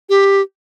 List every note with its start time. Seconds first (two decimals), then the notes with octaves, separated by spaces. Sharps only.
0.09 G4